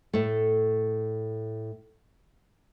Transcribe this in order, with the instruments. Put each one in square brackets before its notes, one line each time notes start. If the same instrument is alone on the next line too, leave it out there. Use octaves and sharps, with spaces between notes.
[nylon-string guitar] A2 A3